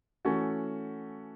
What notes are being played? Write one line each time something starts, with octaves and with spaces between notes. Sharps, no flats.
E3 A3 C#4 F#4 A4